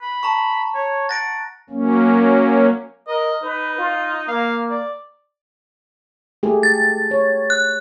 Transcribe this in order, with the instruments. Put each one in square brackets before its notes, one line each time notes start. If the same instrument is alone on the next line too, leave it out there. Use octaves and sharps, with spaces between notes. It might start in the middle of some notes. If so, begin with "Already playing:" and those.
[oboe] B5
[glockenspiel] A5 A#5 C#6
[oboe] C#5
[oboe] F#5 [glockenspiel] A6 A#6 D7
[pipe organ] F#3 A#3 C#4
[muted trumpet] A#4 [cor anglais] D#5
[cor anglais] D#4 [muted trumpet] B4
[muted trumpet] F4
[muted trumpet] A#3 [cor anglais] F5
[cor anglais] D5
[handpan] A3 G4 G#4
[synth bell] A6
[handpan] C#5
[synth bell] F#6